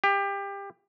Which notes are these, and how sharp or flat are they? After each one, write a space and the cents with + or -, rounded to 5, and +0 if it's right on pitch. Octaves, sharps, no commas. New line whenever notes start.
G4 +25